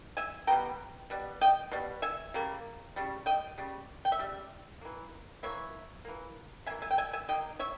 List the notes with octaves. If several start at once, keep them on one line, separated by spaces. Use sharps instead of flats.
E5 G#5
B2 G3 B3 G5 A#5
B2 G3
D#5 G5
B2 G3
E5 G#5
C#3 G3 A#3
C#3 G3
D#5 G5
C#3 G3
G5
E5
C#3 G3
E3 A#3
E3 A#3 C#5 E5
E3 A#3
E3 A#3 E5 G#5
E5 G#5
G5
E5 G#5
E5 G#5
D#3 A#3 D#5 G5
C#5 E5